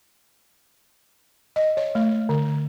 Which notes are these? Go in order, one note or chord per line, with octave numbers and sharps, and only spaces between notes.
D#5
C#5
A3
D3